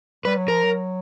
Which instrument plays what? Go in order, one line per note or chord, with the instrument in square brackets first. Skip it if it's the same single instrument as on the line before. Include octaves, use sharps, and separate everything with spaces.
[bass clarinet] G3 [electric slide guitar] B4
[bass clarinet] F#3
[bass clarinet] F3 [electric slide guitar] A#4
[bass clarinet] F#3